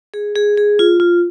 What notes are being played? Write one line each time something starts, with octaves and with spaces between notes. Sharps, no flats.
G#4
G#4
G#4
F4
F4